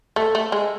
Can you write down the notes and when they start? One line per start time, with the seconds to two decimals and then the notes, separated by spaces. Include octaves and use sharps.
0.16 A3 A4
0.35 A3
0.52 G#3